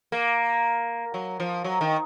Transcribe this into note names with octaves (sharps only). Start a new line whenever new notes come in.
A#3
F#3
F3
F#3
D#3